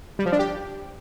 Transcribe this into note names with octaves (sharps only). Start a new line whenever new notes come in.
G3
F3
D4
G4